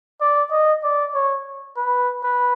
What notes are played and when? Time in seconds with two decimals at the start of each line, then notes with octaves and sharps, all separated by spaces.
0.21 D5
0.51 D#5
0.83 D5
1.15 C#5
1.77 B4
2.23 B4